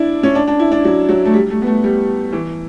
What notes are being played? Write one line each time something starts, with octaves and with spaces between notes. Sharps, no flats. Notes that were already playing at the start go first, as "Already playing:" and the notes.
Already playing: D4 E4
C#4
D4
D4
E4
D4
F#3
F#3
A3
G3
A3
B3
A3
G3
E3